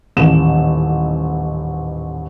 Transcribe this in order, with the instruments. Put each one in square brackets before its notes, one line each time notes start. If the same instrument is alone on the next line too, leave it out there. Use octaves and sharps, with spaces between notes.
[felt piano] D#1 A1 E7